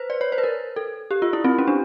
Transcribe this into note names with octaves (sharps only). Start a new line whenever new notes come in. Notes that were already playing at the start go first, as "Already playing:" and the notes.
Already playing: B4 C5
D5
C#5
C5
B4
A#4
A4
G4
F4
E4
C4
C#4
D4